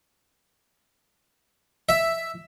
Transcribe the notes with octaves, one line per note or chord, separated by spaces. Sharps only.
E5